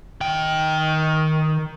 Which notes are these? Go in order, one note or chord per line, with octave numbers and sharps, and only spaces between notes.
D#3 G5